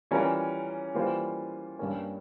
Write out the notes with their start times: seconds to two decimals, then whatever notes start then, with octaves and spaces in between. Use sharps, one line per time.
0.11 E3 G3 C#4 F4 A#4
0.95 E3 G3 A#3 F4 C5
1.79 G2 G3 A#3 C#4